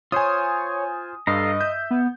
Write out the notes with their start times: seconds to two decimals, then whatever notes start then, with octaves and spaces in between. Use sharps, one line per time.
0.12 F4 C5 C#5 G#5 D#6
1.27 G2 A4 D#5 F5 A#5
1.61 E5 G6
1.91 B3